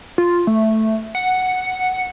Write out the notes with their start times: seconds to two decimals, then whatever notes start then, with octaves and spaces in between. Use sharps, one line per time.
0.18 F4
0.47 A3
1.15 F#5